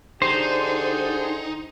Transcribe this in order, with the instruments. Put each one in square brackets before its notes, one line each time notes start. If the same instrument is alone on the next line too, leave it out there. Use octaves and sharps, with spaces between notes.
[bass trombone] D3 [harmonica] D4 G4 G#4 [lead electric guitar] D#4 [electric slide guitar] C5